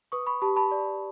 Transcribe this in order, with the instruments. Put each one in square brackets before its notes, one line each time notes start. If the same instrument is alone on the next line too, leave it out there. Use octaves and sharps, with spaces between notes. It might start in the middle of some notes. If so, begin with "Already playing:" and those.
[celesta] B4 C#6 D#6
B5 C#6
G4 A5 B5
A5 B5
D5